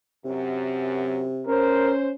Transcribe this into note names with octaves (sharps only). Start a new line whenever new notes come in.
F#2 C3
C#4 A#4 C5